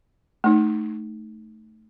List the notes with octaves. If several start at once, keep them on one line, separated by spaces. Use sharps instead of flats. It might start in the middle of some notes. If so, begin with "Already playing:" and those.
A3 D#4